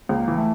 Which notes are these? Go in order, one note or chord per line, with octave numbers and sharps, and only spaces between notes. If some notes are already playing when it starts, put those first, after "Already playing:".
C#2 A#3
E3
A3